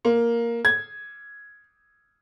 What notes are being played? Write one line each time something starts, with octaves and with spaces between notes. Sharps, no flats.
A#3
G#6